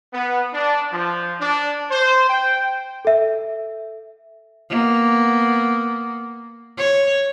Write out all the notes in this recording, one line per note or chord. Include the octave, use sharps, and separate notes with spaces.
B3
D4
F3
D4
C5
G5
A4 E5
A#3 B3
C#5